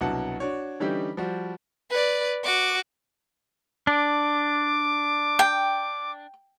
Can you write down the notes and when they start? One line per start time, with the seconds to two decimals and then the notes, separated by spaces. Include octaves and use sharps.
0.01 C2 G2 B2 F#3 F#5 A5
0.40 D4 F#4 C#5
0.80 D3 E3 G3 C#4 D#4 G4
1.17 F3 G3 F#4
1.90 B4 D5
2.44 F#4 D6
3.87 D4 D6
5.39 G5